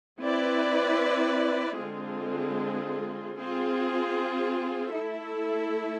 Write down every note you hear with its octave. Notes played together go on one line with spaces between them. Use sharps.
C4 E4 B4 D5
D3 G#3 C4 F4 G#4
C4 F4 G#4
A3 E4 A4 E5